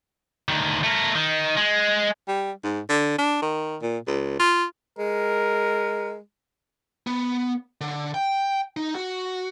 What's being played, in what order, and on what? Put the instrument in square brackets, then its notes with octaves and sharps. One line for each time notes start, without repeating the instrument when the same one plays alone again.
[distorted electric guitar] D2 D#3
A3 A#4
D#3
G#3
[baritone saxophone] G3
G#2
D3
D4
D#3
A#2
C#2
F4
[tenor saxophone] G#3 [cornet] A#4
[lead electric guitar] B3
D3
G5
D#4
F#4